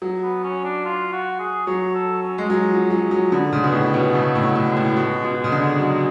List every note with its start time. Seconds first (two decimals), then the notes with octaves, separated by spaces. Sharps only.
0.02 F#3
0.23 B3
0.44 C#4
0.64 D4
0.85 F4
1.12 F#4
1.39 G#4
1.67 F#3 C#5
1.94 A4
2.23 C#4
2.38 G#3
2.50 F#3
2.70 F3
2.90 F#3
3.11 F#3
3.32 D3 B3
3.52 C#3 G#3
3.64 B2
3.74 A2 B3
3.94 B2 C#4
4.14 C#3 A3
4.35 A2
4.42 F#3
4.56 A2
4.70 G#3
4.77 A2
4.97 B2
5.25 B2
5.44 C#3
5.52 D3
5.79 F#3